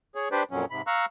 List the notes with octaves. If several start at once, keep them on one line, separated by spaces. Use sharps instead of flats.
G#4 C#5
D4 G4 B4 C5 D5
F2 A#2 F#3 C#4
G#2 C3 B5
F5 A#5 C#6 E6 F#6